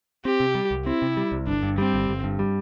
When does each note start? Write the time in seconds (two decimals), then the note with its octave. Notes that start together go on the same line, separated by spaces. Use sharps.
0.25 C4 G4
0.40 C3
0.55 G3
0.71 C2
0.86 C4 E4
1.02 C3
1.17 G3
1.32 C2
1.47 G1 D4
1.63 G2
1.78 G3 C4
1.94 G1
2.09 G1
2.24 G2
2.39 G3